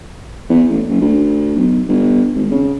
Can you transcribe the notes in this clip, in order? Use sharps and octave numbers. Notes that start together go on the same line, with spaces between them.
E2
A1
F#1
D2
B1
G1
G#1
C#3